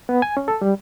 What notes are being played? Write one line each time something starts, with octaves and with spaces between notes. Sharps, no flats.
B3
G#5
C#4
A4
G3